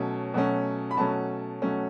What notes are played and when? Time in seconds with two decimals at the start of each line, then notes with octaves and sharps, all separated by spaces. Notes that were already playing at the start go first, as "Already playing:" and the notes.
Already playing: B2 F#3 A3 C#4
0.34 B2 F#3 A3 C#4
0.91 B5
0.97 B2 F#3 A3 C#4 A5
1.62 B2 F#3 A3 C#4